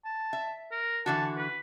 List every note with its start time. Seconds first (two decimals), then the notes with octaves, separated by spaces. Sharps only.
0.05 A5
0.33 E5
0.72 A#4
1.06 D3 E3 F#4 A5
1.37 B4